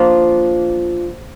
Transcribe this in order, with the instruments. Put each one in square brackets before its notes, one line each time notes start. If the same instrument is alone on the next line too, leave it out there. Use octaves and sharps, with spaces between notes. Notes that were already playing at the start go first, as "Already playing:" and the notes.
Already playing: [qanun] F3 A#3 D4 F4